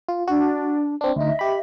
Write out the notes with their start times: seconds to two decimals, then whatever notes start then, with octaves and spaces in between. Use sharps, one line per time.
0.09 F4
0.28 D4 F#4
1.01 C4 D4
1.16 D2 D#4 D#5 E5
1.39 G4 B5